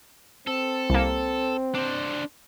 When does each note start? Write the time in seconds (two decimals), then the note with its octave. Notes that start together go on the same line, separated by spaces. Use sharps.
0.47 C4 A4
0.90 C2 A#3
1.75 D4 C5